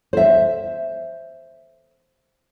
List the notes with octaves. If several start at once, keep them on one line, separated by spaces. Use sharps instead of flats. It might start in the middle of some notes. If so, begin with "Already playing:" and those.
C5 E5